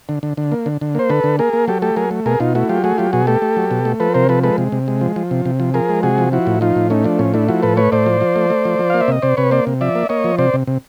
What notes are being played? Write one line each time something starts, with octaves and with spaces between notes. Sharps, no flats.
D3
D3
D3
A#3
D3
D3
A#3 C5
D3 A4 B4
D3
A#3 G#4 A#4
A#3
F#3 G4 A4
A3 G4 A4
F#3 G#4 A#4
A3
B2 G#4 A#4
B2 D#4 F4
A3 E4 F#4
F#3 F4 G4
A3 F#4 G#4
F#3 F4 G4
B2 F#4 G#4
A3 G4 A4
A3
F#3
B2
A3
F3 A4 B4
C3 A#4 C5
F3 A4 B4
G#3 A4 B4
C3
C3
G#3
F3
F3
C3
C3
F3
F3 G#4 A#4
G#3
C3 F#4 G#4
F3
F3 E4 F#4
A2
F3 D#4 F4
A2
A3 C#4 D#4
F3 D4
A2 C#4
A3 D4 E4
F3 E4 F#4
A2 A4 B4
A3 B4 C#5
A2 C5 D5
F3
F3
A3
A3
F3
F3
A#3 F5
E5
C3 D#5
C3 C5 D5
C3 B4 C#5
A#3 C5 D5
C3
F3 D5 E5
A#3
A#3 C#5 D#5
F3
C3 C5 D5
C3
C3